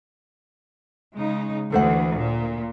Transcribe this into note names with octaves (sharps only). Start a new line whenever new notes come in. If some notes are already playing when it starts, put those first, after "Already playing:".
C#3 G#3 D#4
D2 E3 A4 C5 F#5
A#2